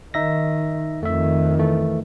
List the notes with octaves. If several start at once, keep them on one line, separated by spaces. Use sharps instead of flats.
D#3 D#4 E5 A#6
F2 D#3 A3 E5
E3 A3